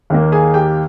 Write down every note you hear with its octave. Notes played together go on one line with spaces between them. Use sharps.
D#2 D#3 A#3
G#4 G#5
G4 G5